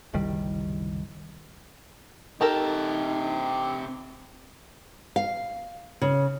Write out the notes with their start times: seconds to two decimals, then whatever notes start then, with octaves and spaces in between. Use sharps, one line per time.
0.14 F#1 C2 D#3 G3
2.41 C3 D#4 G4 A4 A#4 A5
5.16 F5
6.02 C#3